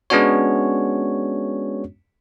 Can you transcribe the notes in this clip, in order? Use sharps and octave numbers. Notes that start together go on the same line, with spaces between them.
G#3 B3 C#4 D4 F#4 C#5